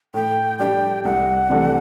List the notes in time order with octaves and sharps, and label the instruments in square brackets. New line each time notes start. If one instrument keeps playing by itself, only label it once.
[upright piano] A2 [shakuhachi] G5
[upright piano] G3 D4 [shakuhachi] G5
[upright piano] C2 [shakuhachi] F#5
[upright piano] C3 E3 A3 D4